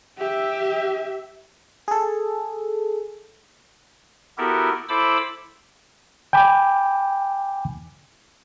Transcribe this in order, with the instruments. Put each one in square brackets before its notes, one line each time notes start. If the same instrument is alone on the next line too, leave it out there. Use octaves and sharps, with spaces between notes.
[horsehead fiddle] G4 E5
[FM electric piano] G#4 A4
[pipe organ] B3 E4 F#4 G4 A4 A#4
E4 A4 C5 B5 D6 E6
[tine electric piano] G5 G#5 B5 D6